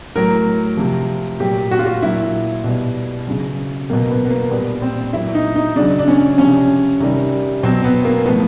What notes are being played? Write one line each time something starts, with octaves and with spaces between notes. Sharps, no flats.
A2 F#3 A#4
C3 F3
A#2 F#3 G4
F#4
F4
F#4
A#2 F#3 E4
B2 G3
C#3 F#3
B2 F#3 A#3
B3
B3
A#3
A#2 G3 B3
C4
A#2 F#3 E4
D#4
D#4
C#3 F#3 D4
D4
C#4
C3 F3 C#4
C3 D#3 G3
B2 F#3 C4
B3
A#3
A2 F3 B3